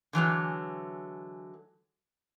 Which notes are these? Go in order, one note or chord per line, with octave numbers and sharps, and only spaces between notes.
D3 E3 F#3 G#3